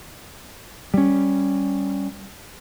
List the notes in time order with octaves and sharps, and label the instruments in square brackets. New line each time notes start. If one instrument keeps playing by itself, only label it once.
[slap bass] G3 C#4